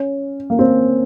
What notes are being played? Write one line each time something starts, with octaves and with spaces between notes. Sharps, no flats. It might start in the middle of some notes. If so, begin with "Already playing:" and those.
Already playing: C#4
A#3
C4